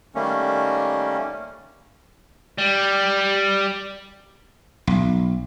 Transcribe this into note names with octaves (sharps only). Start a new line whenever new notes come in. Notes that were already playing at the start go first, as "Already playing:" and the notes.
D#3 G3 A3 A#3 C#4
G3
B1